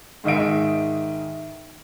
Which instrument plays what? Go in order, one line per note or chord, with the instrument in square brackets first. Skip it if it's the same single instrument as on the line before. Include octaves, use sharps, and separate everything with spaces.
[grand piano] G#2 D#3 D#5 E5 D7